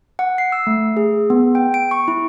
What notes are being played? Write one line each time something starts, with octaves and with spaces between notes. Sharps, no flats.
F#5
C7
E6
A3
G#4
B3
G5
D7
C#6
E4